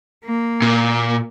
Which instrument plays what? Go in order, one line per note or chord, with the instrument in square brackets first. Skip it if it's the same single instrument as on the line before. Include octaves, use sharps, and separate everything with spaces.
[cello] A#3
[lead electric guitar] A#2